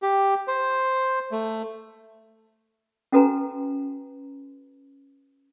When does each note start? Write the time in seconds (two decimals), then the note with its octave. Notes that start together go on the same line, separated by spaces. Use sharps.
0.02 G4
0.48 C5
1.32 A3
3.12 C#4 F#4 A4 B4 G#5 A#5